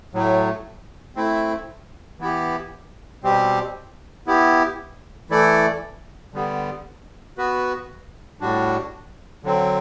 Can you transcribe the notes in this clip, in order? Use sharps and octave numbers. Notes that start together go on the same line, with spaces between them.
A2 F#3 A3
A3 C4 E4
E3 B3 E4 G4
B2 G3 C4 G4
B3 E4 G4
E3 A3 E4 A4 D5
D3 G3 B3
B3 F#4 B4
A2 G3 D4 F#4
D3 F#3 C4